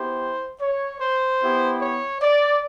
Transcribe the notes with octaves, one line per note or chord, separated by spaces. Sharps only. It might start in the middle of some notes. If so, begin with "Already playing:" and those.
Already playing: B3 E4 G4 C5
C#5
C5
B3 E4 G4
C#5
D5